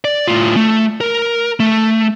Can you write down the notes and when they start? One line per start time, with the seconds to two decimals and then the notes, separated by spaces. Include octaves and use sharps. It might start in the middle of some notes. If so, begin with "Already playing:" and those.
0.04 D5
0.27 A2 F4
0.56 A3
1.00 A#4
1.60 A3